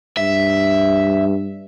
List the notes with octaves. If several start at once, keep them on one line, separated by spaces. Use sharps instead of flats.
G2 E5